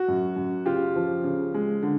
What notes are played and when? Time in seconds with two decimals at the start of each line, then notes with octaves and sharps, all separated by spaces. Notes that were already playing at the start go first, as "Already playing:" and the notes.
Already playing: F#4
0.08 F#2
0.36 F#2
0.66 C#3 F4 G4
0.96 F3
1.24 C#3
1.54 G#3
1.83 D3